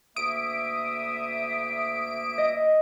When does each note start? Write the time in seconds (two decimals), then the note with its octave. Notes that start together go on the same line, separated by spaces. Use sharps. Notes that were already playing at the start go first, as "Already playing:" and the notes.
0.16 D2 A#3 E5 D#6 D7
2.38 D#5